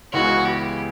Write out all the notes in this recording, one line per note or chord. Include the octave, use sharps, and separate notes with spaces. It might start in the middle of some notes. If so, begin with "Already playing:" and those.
C#2 C#3 E3 G#3 B3 F#4
G4